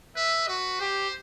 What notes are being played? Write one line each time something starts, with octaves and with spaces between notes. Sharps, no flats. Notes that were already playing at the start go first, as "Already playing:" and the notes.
B4 E5
F#4 B4
G4 C5